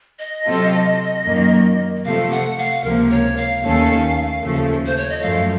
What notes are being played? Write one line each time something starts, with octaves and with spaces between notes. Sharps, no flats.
D#5
C3 F#3 C4 F4 A4
F#2 D#3 F#3 A#3
C3 F3 A3 F5
F#5
F5
C#2 C3 F3 A#3 A#4
C#5
F5
D#2 D#3 A3 C#4 A4
D#2 C#3 F3 A3
C5
C#5
D#5
F#2 F3 A3 F5